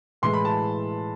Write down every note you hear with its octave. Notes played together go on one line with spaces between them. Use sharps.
A2 E3 G#3 C6
B5
A5